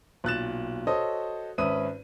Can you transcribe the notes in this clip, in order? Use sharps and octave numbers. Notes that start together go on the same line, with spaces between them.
B1 A#2 F#6 A6 E7
F#4 A4 C5 C#5 D#5 D#6
G#1 C#4 B4 E5 D#6 D#7